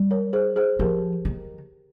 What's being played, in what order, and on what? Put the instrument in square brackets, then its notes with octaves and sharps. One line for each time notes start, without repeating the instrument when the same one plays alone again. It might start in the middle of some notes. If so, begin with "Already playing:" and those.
Already playing: [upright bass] G3
[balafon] A#4 C#5
G#4 C5
G#4 C5
[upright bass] F3 [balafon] G4 A#4
[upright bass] D#3